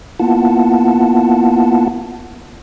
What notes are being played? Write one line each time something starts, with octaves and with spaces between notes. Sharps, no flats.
A#3 B3 E4 F4 F#5 A5